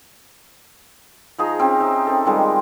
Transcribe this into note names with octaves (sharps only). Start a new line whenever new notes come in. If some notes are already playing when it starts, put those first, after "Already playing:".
F3 D#4 G#4 A#5
C4 C#4 G4
D#4 E5
C4 A4
D#3 F3 G3 G#3